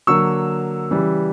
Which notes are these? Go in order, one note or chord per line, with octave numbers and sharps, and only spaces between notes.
D3 F#3 A#3 C#6 E6
C#3 E3 G3